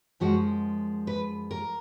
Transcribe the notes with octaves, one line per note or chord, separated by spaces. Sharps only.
F#2 F3 G#3 F#4
B4
A#4